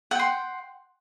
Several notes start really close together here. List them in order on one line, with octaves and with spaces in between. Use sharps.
F#5 G5 C6